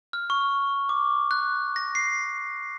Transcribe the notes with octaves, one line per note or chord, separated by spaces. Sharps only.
F6
C#6
D6
F#6
A#6
C7